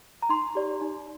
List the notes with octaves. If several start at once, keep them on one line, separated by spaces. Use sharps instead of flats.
A#5
D#4 C6
G4 D5
D#4